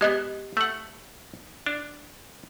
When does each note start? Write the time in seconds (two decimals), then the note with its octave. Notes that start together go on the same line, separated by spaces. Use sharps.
0.01 G#3 B3 G4 D#5
0.57 A3 F#5
1.66 D4